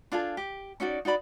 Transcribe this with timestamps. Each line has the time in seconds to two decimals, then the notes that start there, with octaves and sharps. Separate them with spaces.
0.12 D4 F4 G#4 A4
0.37 G4
0.80 C#4 D#4 F#4 D5
1.05 D#4 F#4 D5 B5